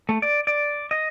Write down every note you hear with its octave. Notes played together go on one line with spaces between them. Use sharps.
A3
D5
D5
D#5